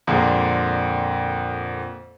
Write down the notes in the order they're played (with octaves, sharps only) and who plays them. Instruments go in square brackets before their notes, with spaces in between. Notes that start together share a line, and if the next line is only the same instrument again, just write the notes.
[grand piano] F2 A#2 D3 G#3 A#3